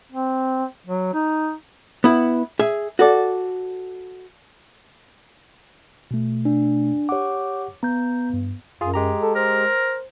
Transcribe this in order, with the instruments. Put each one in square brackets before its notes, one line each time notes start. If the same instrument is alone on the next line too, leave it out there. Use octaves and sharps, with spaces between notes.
[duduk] C4
F#3
D#4
[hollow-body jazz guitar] B3 E4
G#4 E5
F#4 A4 D5
[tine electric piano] B2 A3
[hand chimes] D4
[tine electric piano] G4 F#5 [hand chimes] C#5 D6
[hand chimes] B3 [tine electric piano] A#5 G6
[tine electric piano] G2
[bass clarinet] F#2 [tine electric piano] F4 G#4
[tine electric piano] G#3 G4 A#5
[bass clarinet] A4
[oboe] A#4 [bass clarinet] C5